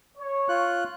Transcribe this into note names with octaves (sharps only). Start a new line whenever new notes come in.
C#5
F4 F#6